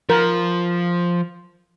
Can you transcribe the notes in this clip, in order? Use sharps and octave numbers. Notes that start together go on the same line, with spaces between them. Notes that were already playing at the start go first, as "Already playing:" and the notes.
F3 A#4